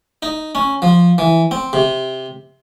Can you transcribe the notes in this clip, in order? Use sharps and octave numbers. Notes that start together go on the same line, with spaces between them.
D#4
C#4
F3
E3
C4
C3